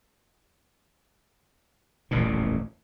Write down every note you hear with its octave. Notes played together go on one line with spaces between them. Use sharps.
D#1 A1 F2 A#2